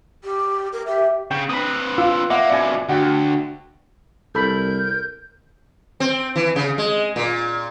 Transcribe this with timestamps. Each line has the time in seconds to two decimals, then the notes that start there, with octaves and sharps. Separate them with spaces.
0.24 G4
0.72 A#4
0.87 G4 E5
1.31 C#3 G5
1.49 C4 B4 B5 D#6
1.98 F4 E6
2.30 A#3 E5 F#5 D6
2.50 F2 B2 D5 G#5
2.89 D2 F#4 F#5 G5
4.35 C2 A4 A#4 B5 G6
6.00 C4
6.36 E3
6.56 C#3
6.78 G#3
7.16 A#2